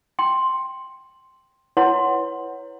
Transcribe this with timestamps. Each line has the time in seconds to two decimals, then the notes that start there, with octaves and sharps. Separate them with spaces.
0.19 G5 C6
1.77 E4 B4 C#5 F#5 C6